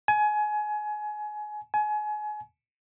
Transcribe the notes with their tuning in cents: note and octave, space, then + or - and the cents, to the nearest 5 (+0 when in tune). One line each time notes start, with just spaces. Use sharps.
G#5 +25
G#5 +30